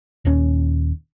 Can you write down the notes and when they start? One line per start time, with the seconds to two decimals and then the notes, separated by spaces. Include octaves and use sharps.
0.25 D#1 D#2 C#4